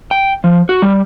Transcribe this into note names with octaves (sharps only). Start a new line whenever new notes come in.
G5
F3
F#4
G3